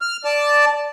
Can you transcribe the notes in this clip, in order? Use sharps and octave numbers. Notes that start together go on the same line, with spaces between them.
F6
D5 A5